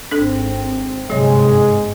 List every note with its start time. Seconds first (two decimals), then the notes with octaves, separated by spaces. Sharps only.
0.11 G#1 C4 D4 A4
1.10 G1 G#2 C3 F#3 G#3 C#5